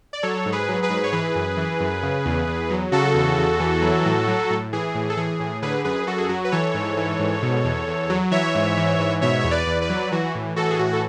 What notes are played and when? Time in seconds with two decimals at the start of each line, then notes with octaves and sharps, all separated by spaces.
0.13 D5
0.23 F#3 A4 C#5
0.45 G#2
0.52 G#4 B4
0.68 F#3
0.83 G#4 B4
0.90 G#2
1.04 C#5
1.12 E3 G#4 B4
1.35 F#2
1.57 E3
1.80 F#2
2.03 C#3
2.26 E2
2.48 E2
2.70 F#3
2.92 C#3 F#4 A4
3.14 E2
3.37 E2
3.60 E3
3.82 F#3
4.05 A2
4.28 F#3
4.50 A2
4.73 E3 G#4
4.95 A2
5.10 A4
5.17 E3 G#4
5.40 A2
5.62 D3 G#4 B4
5.84 F#2 G#4 B4
6.07 F#2 F#4 A4
6.18 G#4
6.29 F#3 F#4
6.45 B4
6.52 E3 A4 C#5
6.74 G#2
6.97 E3
7.19 G#2
7.42 B2
7.65 E2
7.88 E2
8.10 F#3
8.31 E3 C#5 E5
8.55 G#2
8.77 E3
8.99 G#2
9.21 B2 C#5 E5
9.41 E2 C#5
9.51 B4 D5
9.67 E2
9.82 B4 D5
9.89 F#3
10.12 E3 F#4
10.35 A2
10.56 E3 F#4 A4
10.71 G#4
10.79 A2 F#4
10.93 A4